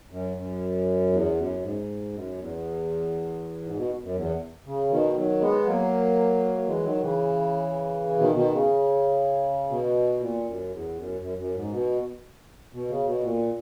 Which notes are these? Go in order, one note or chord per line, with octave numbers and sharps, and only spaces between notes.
F#2
F#2
E2
F#2
G#2
F#2
E2
G#2
B2
F#2
E2
C#3
B2 D#3
D#3 F#3
G#3 B3
F#3 A#3
A#3
E3 G#3
D#3 F#3
C#3 E3
B2 D#3
B2 D#3
C#3
B2
A#2
F#2
E2
F#2
F#2
F#2
G#2
B2
B2
C#3
B2
A#2